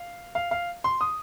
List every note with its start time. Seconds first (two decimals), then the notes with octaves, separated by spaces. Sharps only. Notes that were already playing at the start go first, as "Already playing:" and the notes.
Already playing: F5
0.35 F5
0.51 F5
0.84 C6
1.01 D#6